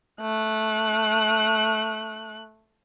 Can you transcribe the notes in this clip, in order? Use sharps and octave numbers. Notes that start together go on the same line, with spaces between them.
A3 F#6